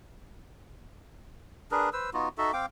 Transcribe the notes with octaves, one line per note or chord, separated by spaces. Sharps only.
D4 G#4 A#4 B4
B4 C5 E6
B3 D#4 F4 F#4
D#4 F#4 A4 E5
C4 F5 G5 D6